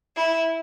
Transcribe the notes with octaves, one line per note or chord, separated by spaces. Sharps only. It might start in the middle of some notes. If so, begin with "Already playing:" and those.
E4